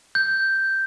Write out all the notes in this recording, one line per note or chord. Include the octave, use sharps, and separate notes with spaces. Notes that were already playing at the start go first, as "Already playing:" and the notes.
G6